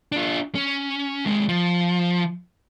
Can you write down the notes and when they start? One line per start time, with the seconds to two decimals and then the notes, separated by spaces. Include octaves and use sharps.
0.12 D4 F4
0.55 C#4
1.25 D#2 G#3
1.49 F3